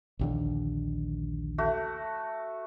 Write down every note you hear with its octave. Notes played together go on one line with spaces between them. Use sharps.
A#1 D#2 D3
A3 F#4